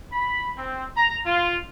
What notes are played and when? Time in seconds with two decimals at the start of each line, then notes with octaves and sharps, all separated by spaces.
0.11 B5
0.57 C4
0.96 A#5
1.26 F4